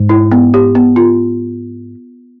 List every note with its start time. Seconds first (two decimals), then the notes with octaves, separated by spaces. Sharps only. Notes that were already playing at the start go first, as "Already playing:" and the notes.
Already playing: G#2
0.09 E4
0.32 B3
0.54 G4
0.75 B3
0.96 F4